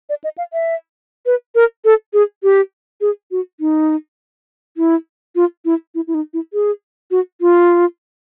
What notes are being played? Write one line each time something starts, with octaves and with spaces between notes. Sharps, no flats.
D5
D#5
F5
E5
B4
A#4
A4
G#4
G4
G#4
F#4
D#4
E4
F4
E4
E4
E4
D#4
E4
G#4
F#4
F4